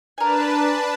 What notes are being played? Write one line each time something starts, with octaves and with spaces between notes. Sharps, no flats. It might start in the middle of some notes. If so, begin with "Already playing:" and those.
D4 A#4 B4 G#5 A5